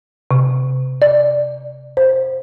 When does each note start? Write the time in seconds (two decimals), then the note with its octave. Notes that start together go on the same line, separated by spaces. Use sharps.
0.31 C3
1.02 D5
1.97 C5